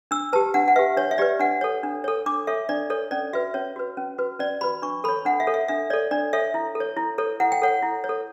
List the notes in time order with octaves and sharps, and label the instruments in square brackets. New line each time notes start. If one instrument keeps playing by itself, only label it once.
[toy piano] D4 E6
G4 B4 A5
D4 F#5
F#5
G4 B4 E5
D4 C#5
E5
G4 B4 D5
D4 F#5
A4 C#5
D4
A4 C#5
D4 D6
A4 C#5 E5
D4 D5
A4 C#5
C#4 D5
F#4 B4 E5
C#4 C#5
F#4 B4
C#4
F#4 B4
C#4 D5
F#4 B4 B5
D4 C#6
A4 B5
C#5
D4 F#5
E5
A4 C#5
E5
D4 E5
A4 C#5 D5
D4 D5
A4 C#5 E5
E4
A4
C#5
E4
A4 C#5
E4 F#5
G5
A4 C#5 F#5
E4
C#5
A4